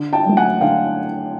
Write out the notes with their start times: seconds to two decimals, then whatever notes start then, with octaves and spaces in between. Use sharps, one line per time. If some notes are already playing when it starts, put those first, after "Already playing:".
Already playing: D3
0.13 G5 A5
0.25 F#3 A3
0.37 F#5 G#5
0.61 D3 F5 G5